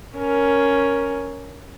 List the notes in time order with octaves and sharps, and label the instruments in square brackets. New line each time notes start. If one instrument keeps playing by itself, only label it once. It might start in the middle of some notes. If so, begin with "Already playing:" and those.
[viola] C#4 A#4